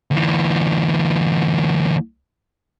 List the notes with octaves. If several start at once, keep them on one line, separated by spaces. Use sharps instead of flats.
D2 E3